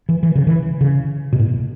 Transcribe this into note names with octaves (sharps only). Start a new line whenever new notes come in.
E3
E3
C#3
E3
C#3
B2
A2